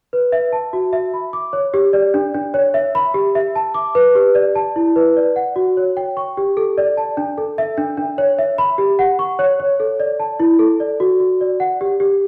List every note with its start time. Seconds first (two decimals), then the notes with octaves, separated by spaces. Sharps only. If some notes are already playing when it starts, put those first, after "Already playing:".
0.13 B4
0.32 E5
0.53 A5
0.73 F#4
0.93 E5
1.14 B5
1.33 D6
1.53 C#5
1.74 G4
1.93 D5
2.14 D4
2.34 D4
2.54 C#5
2.74 E5
2.95 B5
3.14 G4
3.35 E5
3.55 A5
3.74 D6
3.95 B4
4.15 G4
4.35 D5
4.55 A5
4.76 E4
4.96 B4
5.17 D5
5.36 F#5
5.56 F#4
5.77 C#5
5.97 G5
6.17 C#6
6.37 G4
6.57 A4
6.78 D5
6.97 A5
7.17 D4
7.38 A4
7.58 E5
7.78 D4
7.97 D4
8.18 C#5
8.38 E5
8.58 B5
8.78 G4
8.99 F#5
9.19 C#6
9.39 C#5
9.60 C#5
9.80 A4
10.00 D5
10.20 A5
10.40 E4
10.59 A4
10.80 D5
11.00 F#4
11.20 F#4
11.41 D5
11.60 F#5
11.81 G4
12.00 G4